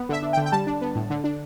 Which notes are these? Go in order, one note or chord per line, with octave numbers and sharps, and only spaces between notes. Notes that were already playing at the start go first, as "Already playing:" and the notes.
Already playing: B3
D3 E5
D4
G5
D3
G5
G3 A5
D4
B3
A2
D3
D4